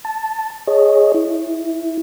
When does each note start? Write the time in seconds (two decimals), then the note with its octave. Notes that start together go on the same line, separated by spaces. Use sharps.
0.05 A5
0.67 G#4 C#5 D#5
1.14 E4